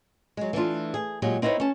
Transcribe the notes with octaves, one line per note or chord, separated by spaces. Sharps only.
F#3 G#3
E3 A3 D4 F4
G#4
A#2 F#3 G#3 G4 G#4
C4 D#4 E4 A4 B4 C#5
C#4 A5